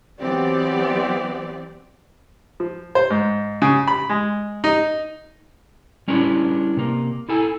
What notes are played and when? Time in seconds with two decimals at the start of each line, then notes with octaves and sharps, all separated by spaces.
0.19 E3 F#3 B3 C4 G4 D5
2.60 F3
2.95 C5
3.10 G#2
3.62 C#3
3.87 B5
4.09 G#3
4.64 D#4
6.08 G3 C#4 D4 E4 B4
6.77 C3 A#3
7.29 E4 A4 G#5